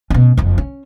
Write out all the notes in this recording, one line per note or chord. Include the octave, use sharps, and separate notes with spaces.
B2 C#4
F#1 F2
C#4